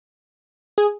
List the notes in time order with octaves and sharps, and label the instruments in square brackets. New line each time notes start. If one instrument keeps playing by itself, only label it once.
[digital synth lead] G#4